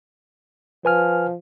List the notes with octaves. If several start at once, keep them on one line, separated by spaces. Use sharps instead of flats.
F3 B4 G#5 F6